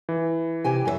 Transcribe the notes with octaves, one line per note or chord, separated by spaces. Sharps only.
E3
C3 G4 G#5
F#2 A#4 E5